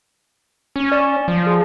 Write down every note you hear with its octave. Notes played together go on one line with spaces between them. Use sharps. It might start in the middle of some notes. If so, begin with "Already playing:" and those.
C#4
D5
F3
G#4